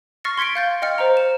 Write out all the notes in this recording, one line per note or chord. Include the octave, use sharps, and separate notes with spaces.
C#6 F6 A6 A#6 C7 C#7
C6 G#6 B6 C#7 D7
F5 G6 A6
D#5 G5 F6 C#7
C5 D#5 A#5
E7